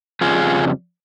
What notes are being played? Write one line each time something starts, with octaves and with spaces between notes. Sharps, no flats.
F2 C#3 G3 F4 G#4